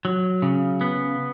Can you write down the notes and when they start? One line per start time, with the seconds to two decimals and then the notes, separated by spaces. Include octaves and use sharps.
0.05 F#3
0.42 C#3
0.81 B3